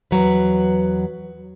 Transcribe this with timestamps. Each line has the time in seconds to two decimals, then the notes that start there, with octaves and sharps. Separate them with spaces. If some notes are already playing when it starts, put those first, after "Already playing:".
0.11 E2 F#3 B4